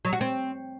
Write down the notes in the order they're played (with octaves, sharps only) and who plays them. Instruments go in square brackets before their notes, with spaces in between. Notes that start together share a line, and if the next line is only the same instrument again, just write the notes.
[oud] F#3
F#4
C4